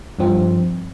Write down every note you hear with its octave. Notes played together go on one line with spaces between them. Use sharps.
G2 F3 C4